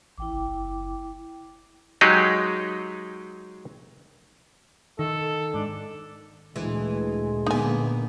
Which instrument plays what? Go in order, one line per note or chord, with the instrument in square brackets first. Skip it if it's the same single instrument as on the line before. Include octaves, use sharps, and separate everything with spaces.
[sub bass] A1 [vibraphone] E4 G5 D6
[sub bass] F#1
[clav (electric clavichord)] F#3 G#3 D#4 G4 G#4 D#5
[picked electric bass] D#3 [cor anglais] A4
[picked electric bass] G#2 [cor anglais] D4
[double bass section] D2 A#2 [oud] E3 [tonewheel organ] G#3
[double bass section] A#2 D3 [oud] A#3 B3 [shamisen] D#4 G#5